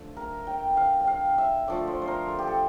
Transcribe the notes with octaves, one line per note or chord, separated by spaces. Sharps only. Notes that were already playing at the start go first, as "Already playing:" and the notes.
Already playing: D3 F3 A3
A#4
G5
F5
G5
F5
E5
D3 F3 A3 D5
C5
C5
A#4
A4
G4
A4